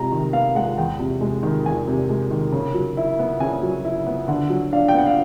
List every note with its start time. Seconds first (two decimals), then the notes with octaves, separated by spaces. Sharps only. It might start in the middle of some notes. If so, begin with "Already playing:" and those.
Already playing: C3 G#3 A#5
0.12 D#3
0.33 B3 F5
0.55 G#3 F#5
0.78 E2 G5
0.99 C3
1.21 G#3
1.43 D#3
1.65 E2 G#5
1.88 C3
2.09 G#3
2.30 D#3
2.52 C#3
2.74 F#3
2.97 E4
3.19 B3
3.40 C#3 G#5
3.63 F#3
3.85 E4
4.07 B3
4.28 D3 F#5
4.50 F#3
4.72 D4 F5
4.88 G5
4.94 B3 F#5
5.06 F5